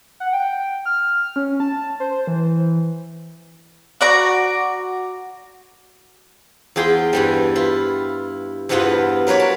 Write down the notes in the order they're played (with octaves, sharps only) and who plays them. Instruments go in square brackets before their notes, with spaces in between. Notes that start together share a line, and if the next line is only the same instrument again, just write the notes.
[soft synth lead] F#5
G5
F6
C#4
A5
C5
E3
[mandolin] F#4 D5 A#5
[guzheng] E2 F4 G#4 G5 C6
G2 E3 G3
E4 F4
E2 G2 E3 B3 F4 F#5
F#3 A#4 B4 C#5 D5
A5